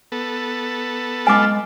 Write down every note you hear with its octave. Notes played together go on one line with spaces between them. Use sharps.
B3 A4
G#3 F4 G#5 D6